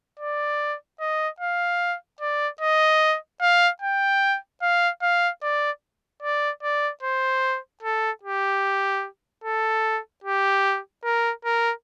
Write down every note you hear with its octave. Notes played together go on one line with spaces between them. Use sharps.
D5
D#5
F5
D5
D#5
F5
G5
F5
F5
D5
D5
D5
C5
A4
G4
A4
G4
A#4
A#4